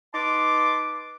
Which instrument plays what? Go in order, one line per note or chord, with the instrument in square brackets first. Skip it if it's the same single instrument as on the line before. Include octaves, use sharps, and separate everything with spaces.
[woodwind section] D#4 B4 A5 C6 D6